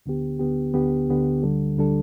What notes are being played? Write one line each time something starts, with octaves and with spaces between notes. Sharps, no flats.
D2 D3 B3 G4
D2 D3 B3 G4
D2 D3 B3 G4
D2 D3 B3 G4
D2 D3 G3 D4 A4
D2 D3 G3 D4 A4